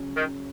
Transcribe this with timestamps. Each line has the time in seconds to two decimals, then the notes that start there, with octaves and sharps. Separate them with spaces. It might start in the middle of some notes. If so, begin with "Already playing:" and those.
Already playing: C#3 F#3 C#4
0.16 D#3